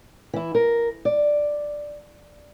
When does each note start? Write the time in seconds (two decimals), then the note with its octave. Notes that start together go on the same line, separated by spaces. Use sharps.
0.34 E3 E4
0.55 A#4
1.05 D5